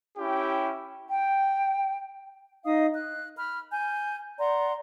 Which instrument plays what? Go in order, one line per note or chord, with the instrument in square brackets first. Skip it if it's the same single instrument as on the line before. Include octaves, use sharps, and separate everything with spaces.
[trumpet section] C#4 E4 G4 G5
[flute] G5
[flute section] D#4 D#5 F5 D#6
F#6
B5 F6
G#5 G6
D5 F#5 A#5 C6